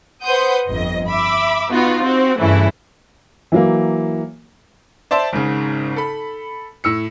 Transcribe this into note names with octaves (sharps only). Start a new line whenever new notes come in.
B4 C5 F#5 C6 D#6 G6
G1 F2 D#5
E5 B5 D6 E6
B3 D#4 F4 F#4
C4 F#4
G2 C#3 E3 A3 C#4 E4
E3 F#3 A#3
C5 D5 E5 A5 C6
G#1 G#2 C#3
A4 B5
A2 E6 C#7